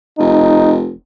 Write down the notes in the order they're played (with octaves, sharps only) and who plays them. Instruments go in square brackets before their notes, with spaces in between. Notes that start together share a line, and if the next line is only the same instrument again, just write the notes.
[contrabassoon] F1 [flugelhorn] D#4